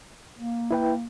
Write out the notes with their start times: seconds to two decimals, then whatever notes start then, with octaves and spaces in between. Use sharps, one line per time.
0.37 A#3
0.71 E4 B4 G5